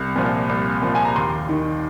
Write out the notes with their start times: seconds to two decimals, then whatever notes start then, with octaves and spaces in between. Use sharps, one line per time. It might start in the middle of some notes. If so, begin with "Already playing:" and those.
Already playing: C2
0.16 A#2 F3
0.49 C2
0.82 A#2 F3
0.95 G#5
1.05 A#5
1.16 D#2 C6
1.49 D#3